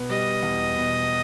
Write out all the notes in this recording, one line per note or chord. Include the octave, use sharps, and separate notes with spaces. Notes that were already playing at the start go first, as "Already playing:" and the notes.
Already playing: B2 B3
G3 D#5
E2
B2